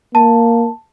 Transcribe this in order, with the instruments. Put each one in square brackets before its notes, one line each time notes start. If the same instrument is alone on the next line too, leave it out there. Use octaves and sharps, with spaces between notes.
[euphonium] A#3 [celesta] A5